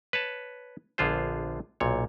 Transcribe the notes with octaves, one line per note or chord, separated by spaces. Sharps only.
B4 C#5 A5
A#1 D3 B3 F4 G#4 C5
B1 A#2 C#5